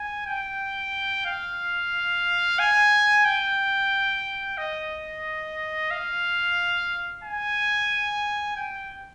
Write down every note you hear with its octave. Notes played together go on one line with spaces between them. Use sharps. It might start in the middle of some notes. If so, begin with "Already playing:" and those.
Already playing: G#5
G5
F5
G#5
G5
D#5
F5
G#5
G5